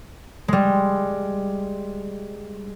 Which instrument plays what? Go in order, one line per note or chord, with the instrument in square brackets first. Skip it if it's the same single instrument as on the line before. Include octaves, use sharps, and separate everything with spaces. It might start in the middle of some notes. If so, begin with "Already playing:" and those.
[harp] G3 G#3